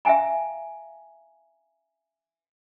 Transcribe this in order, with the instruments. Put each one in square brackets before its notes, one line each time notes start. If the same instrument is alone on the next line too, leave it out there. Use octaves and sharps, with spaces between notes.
[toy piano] E5 F5 G5 G#5 A#5